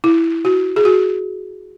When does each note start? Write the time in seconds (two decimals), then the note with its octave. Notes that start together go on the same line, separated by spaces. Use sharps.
0.04 E4
0.45 F#4
0.76 G#4
0.85 F#4